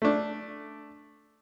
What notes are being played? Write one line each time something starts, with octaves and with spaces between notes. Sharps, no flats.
A3 D4